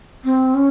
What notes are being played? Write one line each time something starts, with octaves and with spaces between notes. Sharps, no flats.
C4
C#4